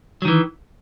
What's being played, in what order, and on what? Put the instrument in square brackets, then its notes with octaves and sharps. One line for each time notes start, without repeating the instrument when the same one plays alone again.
[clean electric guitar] F#3
D#3
E3